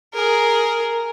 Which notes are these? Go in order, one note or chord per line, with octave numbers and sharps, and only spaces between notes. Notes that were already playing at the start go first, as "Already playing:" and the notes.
G#4 A#4